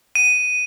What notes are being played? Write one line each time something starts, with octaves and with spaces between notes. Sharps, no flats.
D#7